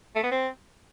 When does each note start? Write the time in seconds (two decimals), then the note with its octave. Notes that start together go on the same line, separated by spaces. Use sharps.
0.15 A3
0.23 B3
0.31 C4